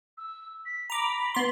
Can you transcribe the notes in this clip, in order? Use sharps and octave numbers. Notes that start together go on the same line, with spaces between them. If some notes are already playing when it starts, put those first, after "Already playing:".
E6
B6
A#5 B5 D6
B3 C6